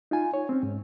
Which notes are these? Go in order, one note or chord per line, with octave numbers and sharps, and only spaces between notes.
D#4 F4 G#5
C#5
C4 C#4
G#2